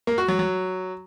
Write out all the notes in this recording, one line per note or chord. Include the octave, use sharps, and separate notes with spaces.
A#3
F#4
F#3
F#3